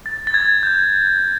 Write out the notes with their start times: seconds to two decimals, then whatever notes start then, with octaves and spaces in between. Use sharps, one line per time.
0.06 A6
0.27 A6
0.34 G#6
0.63 G6